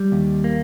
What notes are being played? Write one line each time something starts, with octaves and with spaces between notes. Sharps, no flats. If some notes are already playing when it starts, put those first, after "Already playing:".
Already playing: G3
D#2
A#3